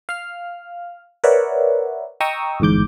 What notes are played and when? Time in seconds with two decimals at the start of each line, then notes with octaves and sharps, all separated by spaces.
0.09 F5 F6
1.24 A#4 B4 C#5 D5 E5 F#5
2.20 D#5 G5 A#5 C#6 D#6 E6
2.60 G1 E2 G#2 D6 G6